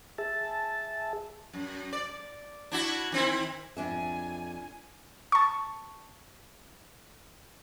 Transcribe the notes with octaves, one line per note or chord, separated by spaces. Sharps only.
G#4 E5 A5
F#2
D5
D4 E4 F#4
D#3 C4 E4
F2 D4 E5 G#5
A5 C#6